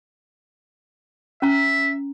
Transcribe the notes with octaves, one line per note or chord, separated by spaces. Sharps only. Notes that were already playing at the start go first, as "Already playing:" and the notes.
C#4 E5 A#5